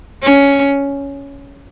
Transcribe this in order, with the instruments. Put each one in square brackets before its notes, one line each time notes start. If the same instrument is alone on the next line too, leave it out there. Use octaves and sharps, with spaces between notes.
[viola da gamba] C#4